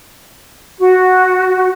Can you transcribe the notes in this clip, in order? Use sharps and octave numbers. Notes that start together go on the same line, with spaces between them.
F#4